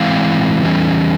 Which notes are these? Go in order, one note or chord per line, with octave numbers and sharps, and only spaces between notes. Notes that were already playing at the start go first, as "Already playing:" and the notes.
Already playing: E3 G#3 C4 E4 F5
E3 G3 C#4